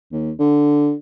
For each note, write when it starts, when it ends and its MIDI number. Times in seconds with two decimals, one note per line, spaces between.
0.12 0.31 39
0.39 0.93 50